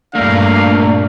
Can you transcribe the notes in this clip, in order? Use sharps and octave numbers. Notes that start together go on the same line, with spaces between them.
G2 A#2 A3 A#3 D4 F5